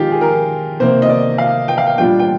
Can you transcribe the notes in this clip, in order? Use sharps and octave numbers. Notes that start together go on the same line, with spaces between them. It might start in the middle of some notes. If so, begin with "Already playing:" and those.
Already playing: D#3 G#3 D#4 F4 G4
G#4
A#4
C3 D#3 A#3 C5
D#5
D5
F5
G5
F5
G5
A#2 G3 D4 F4 G5
G5